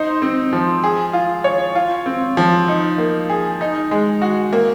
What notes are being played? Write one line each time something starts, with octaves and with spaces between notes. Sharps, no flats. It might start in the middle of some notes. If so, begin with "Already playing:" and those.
Already playing: D#4 C5
C4
F3
G#4
F4
C#5
F4
C4
F3
D#4
A#3
G#4
D#4
G#3
F#4
A#3